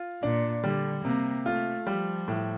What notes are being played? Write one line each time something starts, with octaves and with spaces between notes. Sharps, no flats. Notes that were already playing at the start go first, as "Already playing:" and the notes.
Already playing: F4
A#2 D4
D3 G3
C3 A#3
A3 F4
F3 G3
A2